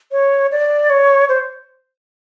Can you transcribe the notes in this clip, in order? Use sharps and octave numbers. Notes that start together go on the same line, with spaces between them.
C#5
D5
C#5
C5